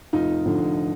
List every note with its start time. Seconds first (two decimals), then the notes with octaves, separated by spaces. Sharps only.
0.13 F1 D#4 F4
0.45 F2 D3 F3